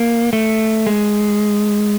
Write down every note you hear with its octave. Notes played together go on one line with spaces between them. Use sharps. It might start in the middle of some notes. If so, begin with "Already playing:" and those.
Already playing: A#3
A3
G#3